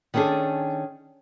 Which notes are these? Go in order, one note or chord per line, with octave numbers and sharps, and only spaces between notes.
D#3 B3 C#4 D4 G#4 A4